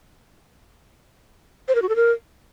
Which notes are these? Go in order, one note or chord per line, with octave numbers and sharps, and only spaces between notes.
C5
A#4
F#4
A4
A#4